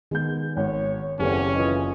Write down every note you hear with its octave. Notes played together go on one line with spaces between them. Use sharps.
D#3 G#3 B3 G6
G#1 C#5
F#1 E2 C4 C#4 G4 A4
E3 F4 D#5